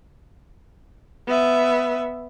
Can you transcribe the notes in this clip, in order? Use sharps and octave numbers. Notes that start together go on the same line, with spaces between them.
B3 E5